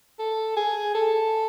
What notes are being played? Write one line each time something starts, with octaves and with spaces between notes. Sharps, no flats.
A4
G#4
A4